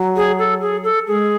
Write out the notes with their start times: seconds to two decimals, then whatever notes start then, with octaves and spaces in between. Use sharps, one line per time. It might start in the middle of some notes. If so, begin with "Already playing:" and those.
Already playing: F#3
0.16 G#4
0.39 A4
0.61 G#4
0.84 A4
1.08 G#3 G#4